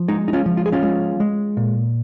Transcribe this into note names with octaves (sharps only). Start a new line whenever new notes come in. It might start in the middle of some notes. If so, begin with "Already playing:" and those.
Already playing: F3
G#3 D#4
D#4
C#4 F4
F3
F4
G#4
C#4 F4
G#3
G#3
A#2